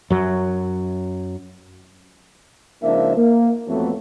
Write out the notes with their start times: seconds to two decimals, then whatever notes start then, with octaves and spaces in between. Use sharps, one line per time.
0.10 F#2 F#3
2.83 C#2 F3 A#3 D4 D#4 E5
3.17 A#3
3.68 F2 A2 E3 F#3 A3 B3